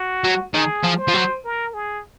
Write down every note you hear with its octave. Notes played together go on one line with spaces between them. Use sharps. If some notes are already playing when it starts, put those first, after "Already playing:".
Already playing: F#4
F#3
D#3 G#4
F3
C5
F3
F#3
A#4
G#4